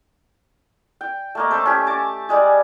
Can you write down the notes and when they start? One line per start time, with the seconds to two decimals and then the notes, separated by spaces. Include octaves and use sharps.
1.01 G5
1.35 A3 A#3 D#5
1.51 C5 E5 A5 C#6
1.66 C#4 G4
1.87 A5 D6
2.29 G3 G#3 G#4